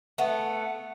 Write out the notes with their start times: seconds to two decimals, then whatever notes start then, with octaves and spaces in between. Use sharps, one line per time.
0.18 A3 B3